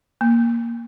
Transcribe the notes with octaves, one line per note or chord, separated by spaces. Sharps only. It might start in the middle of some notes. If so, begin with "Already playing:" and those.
A#3